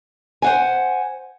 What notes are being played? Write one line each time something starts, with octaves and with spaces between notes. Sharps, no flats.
C5 F#5 G#5